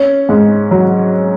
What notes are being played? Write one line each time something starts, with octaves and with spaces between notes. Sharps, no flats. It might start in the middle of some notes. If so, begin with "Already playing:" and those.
Already playing: C#4
G#2
F#3